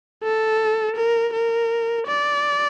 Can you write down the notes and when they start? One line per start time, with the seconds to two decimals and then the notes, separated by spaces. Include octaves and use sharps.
0.23 A4
0.96 A#4
1.33 A#4
2.07 D5